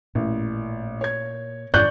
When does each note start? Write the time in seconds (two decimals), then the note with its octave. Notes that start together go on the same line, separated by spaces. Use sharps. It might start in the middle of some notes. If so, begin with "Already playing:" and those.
0.15 A1 A#2
1.01 C#5 G#6
1.74 F2 G#2 C#4 D5 C#6 F#6 G6